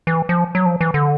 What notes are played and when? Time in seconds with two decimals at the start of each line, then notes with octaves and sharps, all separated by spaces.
0.07 E3
0.29 F3
0.55 F#3
0.66 F3
0.81 E3
0.94 D3